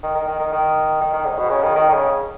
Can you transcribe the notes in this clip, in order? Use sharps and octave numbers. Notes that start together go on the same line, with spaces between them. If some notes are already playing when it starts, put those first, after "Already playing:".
D#3
D#3
D#3
D#3
D#3
D#3
D#3
G#2
B2
C#3
D#3
D#3
D#3
C#3